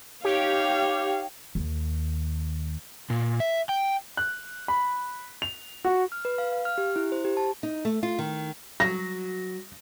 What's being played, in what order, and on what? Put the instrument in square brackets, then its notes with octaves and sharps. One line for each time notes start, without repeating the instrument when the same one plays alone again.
[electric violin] D#4 C#5 [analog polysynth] G4 [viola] F5
[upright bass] D#2
[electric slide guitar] A#2
E5
G5
[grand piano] F#6
B5
F7
F#4
[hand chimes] F6
B4
F5
F5
F6
G4
E4
C5
G4
A5
[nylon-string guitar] D#4
A3
F4
D#3
[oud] F#3 [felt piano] A#6